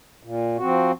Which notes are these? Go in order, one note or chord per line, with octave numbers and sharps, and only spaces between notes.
A#2
F3 C4 F#4